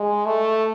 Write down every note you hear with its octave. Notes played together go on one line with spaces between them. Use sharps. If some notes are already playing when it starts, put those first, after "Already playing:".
Already playing: G#3
A3